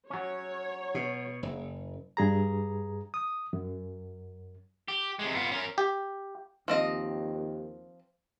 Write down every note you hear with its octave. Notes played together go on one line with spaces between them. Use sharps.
F#3 C#4 C#5
B2
F#1
G2 G#4 A#5
D#6
F#2
G4
C3 G#3
B3 F4
C#4 A#4
G4
D#2 F3 C4 D#5